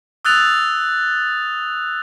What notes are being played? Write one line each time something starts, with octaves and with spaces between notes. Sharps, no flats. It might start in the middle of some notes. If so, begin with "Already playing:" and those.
D#6 E6 F#6 A6 F7